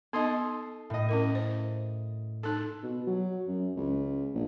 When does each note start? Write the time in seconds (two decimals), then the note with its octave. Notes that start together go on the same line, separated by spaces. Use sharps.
0.13 B3 D#4 A4 D#5 C6 D#6
0.90 A2 D#5
1.09 C#4 E4 A#4
1.35 C5
2.43 D#4 A4 A5 F#6
2.83 B2
3.07 F#3
3.48 F#2
3.76 C#2
4.34 A#1